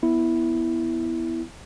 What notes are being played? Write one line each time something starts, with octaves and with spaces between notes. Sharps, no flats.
B3 E4